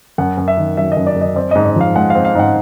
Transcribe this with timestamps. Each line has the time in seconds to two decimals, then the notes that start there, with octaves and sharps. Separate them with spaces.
0.18 F#2 F#5
0.38 F#2
0.48 E5
0.57 D#3
0.77 F#3 E5
0.92 D#5
0.97 F#2
1.07 D5
1.16 F#2
1.21 D#5
1.36 C4 D5
1.51 G#2 D#5
1.66 D#5
1.76 F3 F5
1.96 G#3 F#5
2.10 C4 F5
2.25 F5
2.35 G#2 F#5